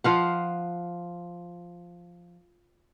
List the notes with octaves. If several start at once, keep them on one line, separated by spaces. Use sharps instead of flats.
F3 F5 F#5